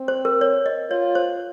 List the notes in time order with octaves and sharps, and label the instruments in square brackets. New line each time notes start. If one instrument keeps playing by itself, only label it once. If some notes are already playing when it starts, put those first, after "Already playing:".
Already playing: [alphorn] C4
[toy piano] C5
A#4
C#5
D#5
[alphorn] F4 [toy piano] C#5
[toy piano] C5